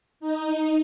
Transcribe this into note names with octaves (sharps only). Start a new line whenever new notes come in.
D#4